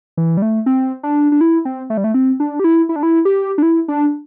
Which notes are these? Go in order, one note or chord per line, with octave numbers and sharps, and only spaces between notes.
E3
G3
A3
C4
D4
D4
E4
C4
A3
G3
A3
C4
D4
G4
E4
E4
D4
E4
G4
D4
E4
D4